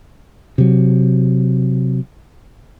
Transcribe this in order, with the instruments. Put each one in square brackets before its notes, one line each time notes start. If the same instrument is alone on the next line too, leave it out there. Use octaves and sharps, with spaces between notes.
[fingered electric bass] C3 F#3